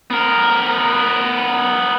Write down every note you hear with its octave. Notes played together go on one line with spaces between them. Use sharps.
B3 A#4